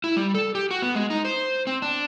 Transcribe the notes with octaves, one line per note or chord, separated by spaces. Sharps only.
E4
G3
A4
G4
F#4
B3
G#3
D#4
C5
C4
D4